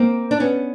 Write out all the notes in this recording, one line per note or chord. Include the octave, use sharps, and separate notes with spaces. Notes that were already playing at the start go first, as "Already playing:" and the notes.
Already playing: A#3 C4
D4
B3 C#4